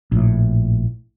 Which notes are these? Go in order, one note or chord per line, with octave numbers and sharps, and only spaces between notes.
A#1 A2